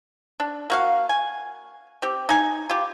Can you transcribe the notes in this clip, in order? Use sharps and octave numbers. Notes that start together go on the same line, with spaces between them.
D4
A#3 F#4 F5
G#5
C4 G4
D#4 G#5
F4 G4